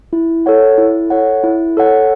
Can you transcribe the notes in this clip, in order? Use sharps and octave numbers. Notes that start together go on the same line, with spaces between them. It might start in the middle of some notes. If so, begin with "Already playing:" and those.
E4
A4 C#5 F#5
E4
A4 C#5 F#5
E4
A4 C#5 F#5